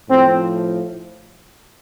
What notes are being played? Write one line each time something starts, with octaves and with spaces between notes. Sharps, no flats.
A2 F3 C4